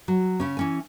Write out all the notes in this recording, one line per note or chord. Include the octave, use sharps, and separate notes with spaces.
F#3
C#3 C#4
E3 C#4 G#5